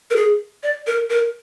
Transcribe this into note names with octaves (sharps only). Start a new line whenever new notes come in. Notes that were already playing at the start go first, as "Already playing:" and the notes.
A#4
G#4
D5
A#4
A#4